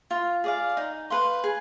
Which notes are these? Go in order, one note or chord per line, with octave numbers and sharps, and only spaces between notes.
F4
G#4 D5 F5
D#4
B4 F5 C6
G#4